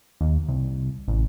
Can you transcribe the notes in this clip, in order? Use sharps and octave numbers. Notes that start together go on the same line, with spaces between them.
D#2
C2
A1